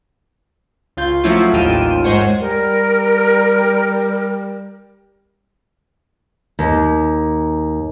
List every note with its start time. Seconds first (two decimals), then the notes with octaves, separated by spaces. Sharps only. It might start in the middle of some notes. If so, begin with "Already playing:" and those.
0.97 C#2 F4 G6
1.24 F3 F#3 A3 C#4 E4 F4
1.53 A1 D#2 F4 G5 D#7 E7
2.04 G#2 G#3 C5 C#5 F#5
2.40 G3 A#4
6.59 D#2